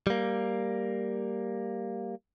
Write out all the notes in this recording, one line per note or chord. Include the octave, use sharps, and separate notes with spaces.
G3 A#3